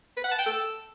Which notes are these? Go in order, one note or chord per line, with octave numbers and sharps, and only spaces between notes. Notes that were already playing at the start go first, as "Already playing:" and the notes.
B4
F#5
A5
G5
A4